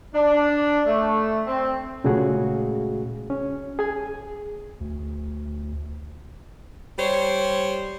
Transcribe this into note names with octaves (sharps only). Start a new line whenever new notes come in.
D4
A3
C4
A#2 C#3 G#3 A3 F#4 G#4
C#4
G#4 G#5
D2
G3 C5 C#5